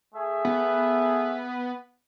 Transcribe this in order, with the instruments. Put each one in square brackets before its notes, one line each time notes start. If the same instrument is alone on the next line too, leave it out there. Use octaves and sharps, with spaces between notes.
[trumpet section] A3 G#4 E5
[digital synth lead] B3